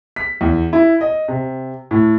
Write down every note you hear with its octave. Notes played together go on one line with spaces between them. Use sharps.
B6
E2
E4
D#5
C3
A2